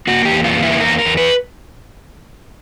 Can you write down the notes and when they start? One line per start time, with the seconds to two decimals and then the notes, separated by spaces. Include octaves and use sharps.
0.07 A#3 F#4
0.25 G4
0.32 E2
0.44 F4
0.57 A#3
0.63 E4
0.80 E2 A#4
0.98 A#4
1.05 E2
1.17 B4